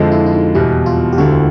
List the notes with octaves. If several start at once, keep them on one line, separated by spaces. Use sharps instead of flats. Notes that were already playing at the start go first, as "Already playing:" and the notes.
Already playing: F2 D3 F3 G#3 E4 F4
E4
E4
D#4
E2 B2 G3 E4
F4
G4
E1 D2 D3 F#4